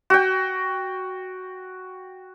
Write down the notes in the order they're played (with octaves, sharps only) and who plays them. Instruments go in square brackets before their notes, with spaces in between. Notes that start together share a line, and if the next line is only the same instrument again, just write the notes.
[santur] F#4 G5